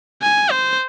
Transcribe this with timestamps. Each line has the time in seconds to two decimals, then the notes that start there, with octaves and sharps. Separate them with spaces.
0.22 G#5
0.51 C5